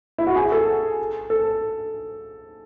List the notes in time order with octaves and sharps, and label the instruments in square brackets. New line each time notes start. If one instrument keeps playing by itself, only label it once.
[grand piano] E4
F#4
G#4
A4
A4